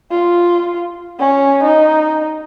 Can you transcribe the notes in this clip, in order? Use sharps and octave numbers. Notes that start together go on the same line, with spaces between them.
F4
C#4
D#4